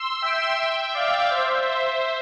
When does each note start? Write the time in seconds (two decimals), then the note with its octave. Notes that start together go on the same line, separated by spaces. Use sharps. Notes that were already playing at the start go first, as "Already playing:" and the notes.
Already playing: C6 E6
0.22 E5 G5
0.94 D5 F5
1.31 C5 E5
1.67 C5 E5